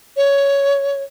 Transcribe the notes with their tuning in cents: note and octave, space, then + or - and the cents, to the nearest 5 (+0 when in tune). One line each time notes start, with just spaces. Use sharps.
C#5 +10